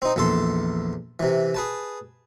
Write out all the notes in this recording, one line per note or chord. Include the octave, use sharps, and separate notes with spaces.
C4 D#4
A#1 E2 A4 A5 C6
C3 E3
G#4 B4 A5